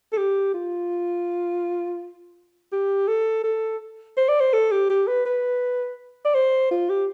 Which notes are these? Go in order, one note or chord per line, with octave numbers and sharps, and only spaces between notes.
A4
G4
F4
G4
A4
A4
C5
D5
C5
A4
G4
G4
B4
B4
D5
C5
F4
G4